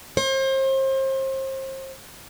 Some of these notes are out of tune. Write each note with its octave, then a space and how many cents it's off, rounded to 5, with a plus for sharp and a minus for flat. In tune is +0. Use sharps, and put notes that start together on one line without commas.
C5 +35